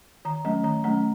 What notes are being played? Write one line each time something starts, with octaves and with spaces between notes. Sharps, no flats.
D#3 A#5
F#3 A3 C#4 A#5
D#3 A#5
F#3 A3 C#4 A#5